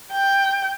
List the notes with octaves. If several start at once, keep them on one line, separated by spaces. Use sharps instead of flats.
G5